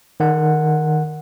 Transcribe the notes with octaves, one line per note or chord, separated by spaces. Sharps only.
D#3 F#5